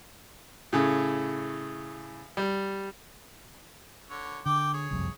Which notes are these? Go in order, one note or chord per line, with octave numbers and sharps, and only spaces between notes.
A2 C#3
G3
D3 C#5
D3 G5 D6
G#4 C#5
F#1 C2 F2